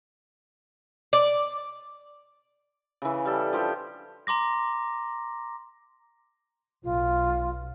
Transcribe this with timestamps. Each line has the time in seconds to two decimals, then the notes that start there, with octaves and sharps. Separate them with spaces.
1.13 D5
3.02 C#3 E3
3.25 G3 A4
3.53 F3 D4 G4
4.27 A#5 C6 D6 A#6
6.84 B1 B2 F#3 F4